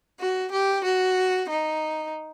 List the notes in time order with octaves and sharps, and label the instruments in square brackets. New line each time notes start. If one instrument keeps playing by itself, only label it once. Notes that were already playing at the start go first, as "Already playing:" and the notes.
[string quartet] F#4
G4
F#4
D#4